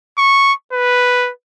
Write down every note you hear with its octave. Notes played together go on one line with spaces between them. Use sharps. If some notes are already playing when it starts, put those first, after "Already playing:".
C#6
B4